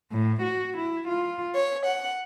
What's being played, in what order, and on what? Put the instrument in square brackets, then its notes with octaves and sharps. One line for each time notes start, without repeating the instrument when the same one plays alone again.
[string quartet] A2
F#4
E4
F4
C#5
F#5